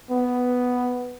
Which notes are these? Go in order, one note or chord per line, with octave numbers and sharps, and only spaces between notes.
B3